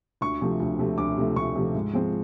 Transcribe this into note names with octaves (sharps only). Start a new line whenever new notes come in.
D2 C#6
C3 F3 A3
D2
C3 F3 A3
D2 D6
C3 F3 A3
D2 C#6
C3 F3 A3
G#2
F3 G#3 C4